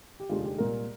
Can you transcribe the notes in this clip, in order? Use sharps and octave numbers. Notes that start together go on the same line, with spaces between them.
G4
F1 D#2 D3 G#3 F4
G4
C2 A#2 G#3 A#4